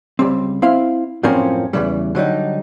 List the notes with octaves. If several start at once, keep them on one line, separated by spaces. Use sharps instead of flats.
C#2 G3 C4
C4 E4 F5
F#2 A2 F3 A#3 C4 C#4
E2 G#2 C#3 E3 G3
D3 F#3 G3 D#4